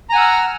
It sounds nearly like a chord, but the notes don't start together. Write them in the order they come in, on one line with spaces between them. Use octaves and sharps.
A#5 G#5 F#5 E6 F6